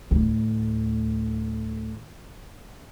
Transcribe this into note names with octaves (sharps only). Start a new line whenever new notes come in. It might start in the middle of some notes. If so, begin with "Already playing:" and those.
D2 A2